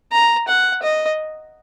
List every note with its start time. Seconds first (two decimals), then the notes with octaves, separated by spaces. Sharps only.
0.12 A#5
0.48 F#5
0.83 D#5